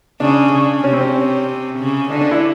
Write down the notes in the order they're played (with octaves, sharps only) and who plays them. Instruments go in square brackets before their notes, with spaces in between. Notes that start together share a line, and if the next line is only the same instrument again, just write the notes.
[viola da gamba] C#3 [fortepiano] D4
[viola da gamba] C#3
[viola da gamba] C3 [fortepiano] C#4
[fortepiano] C4
C#4
[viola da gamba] C#3
[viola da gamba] D3 [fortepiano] D4
[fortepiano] D4
E4